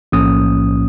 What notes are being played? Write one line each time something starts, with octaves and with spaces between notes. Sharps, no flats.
B1 A2 F3 A#3 C#4 D#6